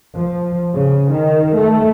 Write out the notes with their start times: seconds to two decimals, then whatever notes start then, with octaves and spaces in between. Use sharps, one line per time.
0.16 F3
0.74 C#3
1.12 D#3
1.57 A3